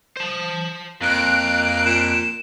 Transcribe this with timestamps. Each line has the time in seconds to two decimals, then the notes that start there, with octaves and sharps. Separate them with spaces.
0.17 C5 A5
1.02 F2 A#3 F#6 D7
1.86 A#2 E7